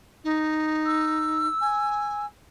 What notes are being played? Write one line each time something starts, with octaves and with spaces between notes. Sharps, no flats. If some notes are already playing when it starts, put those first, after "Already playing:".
D#4
E6
G#5